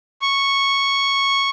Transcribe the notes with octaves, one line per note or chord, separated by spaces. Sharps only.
C#6